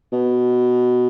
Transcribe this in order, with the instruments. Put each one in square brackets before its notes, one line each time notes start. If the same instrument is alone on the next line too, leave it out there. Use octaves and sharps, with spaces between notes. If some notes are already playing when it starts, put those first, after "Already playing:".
[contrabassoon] B2